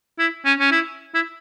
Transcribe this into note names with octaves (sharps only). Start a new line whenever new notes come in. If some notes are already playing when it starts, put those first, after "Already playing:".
E4
C#4
C#4
E4
E4